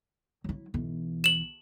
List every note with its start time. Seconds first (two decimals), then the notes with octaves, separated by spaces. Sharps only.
0.44 F#3 E4
0.74 B1 E3
1.24 E7 F#7